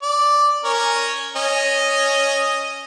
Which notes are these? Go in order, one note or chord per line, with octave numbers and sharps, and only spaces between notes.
D5
C#4 A#4 C#5
C#4 D#5